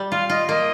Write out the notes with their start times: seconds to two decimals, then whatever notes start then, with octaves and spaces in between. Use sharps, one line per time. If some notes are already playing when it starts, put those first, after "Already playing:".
Already playing: G3
0.12 F4 F5
0.29 F4 D#5
0.49 A#3 D#5